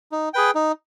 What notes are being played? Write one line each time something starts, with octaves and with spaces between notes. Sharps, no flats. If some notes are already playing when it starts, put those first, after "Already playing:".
D#4
G#4 B4 G5
D#4